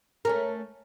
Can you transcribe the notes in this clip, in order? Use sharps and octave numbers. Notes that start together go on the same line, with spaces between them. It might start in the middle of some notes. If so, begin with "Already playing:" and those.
A3 C#4 A#4